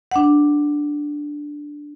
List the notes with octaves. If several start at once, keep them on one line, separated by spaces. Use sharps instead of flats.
D4 F#5